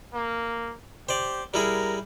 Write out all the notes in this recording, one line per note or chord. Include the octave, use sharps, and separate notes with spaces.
A#3
G4 C5 D5
G3 E4 G#4 A#4